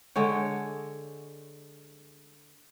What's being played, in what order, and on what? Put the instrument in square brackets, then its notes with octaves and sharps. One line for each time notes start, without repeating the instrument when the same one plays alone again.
[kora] D3 G#3 C#5 G5